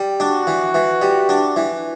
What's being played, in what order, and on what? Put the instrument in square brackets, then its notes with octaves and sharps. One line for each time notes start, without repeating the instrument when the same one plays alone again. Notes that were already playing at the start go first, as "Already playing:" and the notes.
Already playing: [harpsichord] G3
[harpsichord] D4 [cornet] F#4
[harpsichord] E3
E3
G3
D4
E3